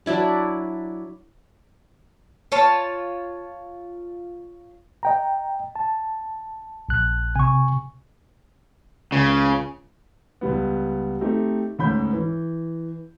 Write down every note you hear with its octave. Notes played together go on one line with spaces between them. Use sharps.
F#3 D4 E4 B5
F4 C#5 A5
D#5 G5 A#5
A5
A#1 F#6
C3 G#5 C#6
C#2 C#3
C#2 G3 B3
A3 C4 D#4 G4
D2 G#2 C#4 B5 G6
E3